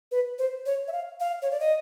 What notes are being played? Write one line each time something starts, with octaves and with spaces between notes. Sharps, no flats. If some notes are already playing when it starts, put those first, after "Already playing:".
B4
C5
C#5
E5
F5
F5
C#5
D5
D#5